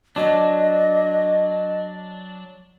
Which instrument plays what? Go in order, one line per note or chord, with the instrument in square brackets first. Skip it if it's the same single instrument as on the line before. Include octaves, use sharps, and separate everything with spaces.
[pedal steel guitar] F#3 D4 [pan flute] D#5